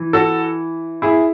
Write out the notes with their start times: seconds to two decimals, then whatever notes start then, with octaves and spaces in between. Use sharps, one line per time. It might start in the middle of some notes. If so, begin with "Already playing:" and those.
Already playing: E3
0.13 F#4 A4
1.02 E4 G#4